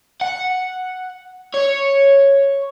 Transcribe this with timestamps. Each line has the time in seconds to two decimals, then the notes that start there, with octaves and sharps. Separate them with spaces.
0.21 F#5
1.54 C#5